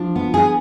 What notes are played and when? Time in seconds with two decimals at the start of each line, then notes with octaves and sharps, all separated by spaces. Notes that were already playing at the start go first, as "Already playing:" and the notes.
Already playing: F3 D4
0.16 B3
0.34 G#4